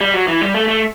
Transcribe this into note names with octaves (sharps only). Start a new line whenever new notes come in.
G3
F#3
E3
G3
A3
A3